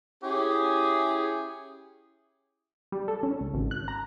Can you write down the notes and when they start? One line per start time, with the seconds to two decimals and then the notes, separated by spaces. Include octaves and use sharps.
0.24 C#4 E4 G4 G#4
2.92 G3
3.08 A4
3.23 C#4
3.40 C#2
3.53 G#1
3.71 F#6
3.88 A#5